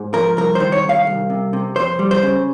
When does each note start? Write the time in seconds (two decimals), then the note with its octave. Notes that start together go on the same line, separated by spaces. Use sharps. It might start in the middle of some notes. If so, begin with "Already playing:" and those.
Already playing: G#2
0.14 F3 A#4
0.37 C2 A#4
0.55 D#3 C5
0.72 C#5
0.84 C2 F5
1.07 C2
1.30 C3
1.53 C3
1.76 F2 C5
1.99 G3
2.11 C5
2.23 C#3